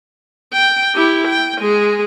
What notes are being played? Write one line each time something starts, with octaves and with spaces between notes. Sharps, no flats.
G5
E4 G4
G5
G#3 G#4